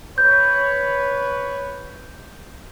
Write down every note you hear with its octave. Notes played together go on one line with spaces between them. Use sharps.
B4 C#5 G6